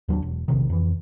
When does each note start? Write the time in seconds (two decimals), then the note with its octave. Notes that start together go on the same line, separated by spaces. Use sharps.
0.08 D#2 F#3 B3 D4
0.22 E1
0.48 A#1 C3 D#3
0.69 F2 E3